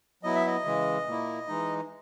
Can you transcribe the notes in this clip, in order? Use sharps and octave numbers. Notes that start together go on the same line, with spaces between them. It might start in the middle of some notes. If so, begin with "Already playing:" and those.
F#3 B3 E4 D#5
E5
D#5
C#3 E3 G#3
A#2 A#3 E4
E3 G#3 D#4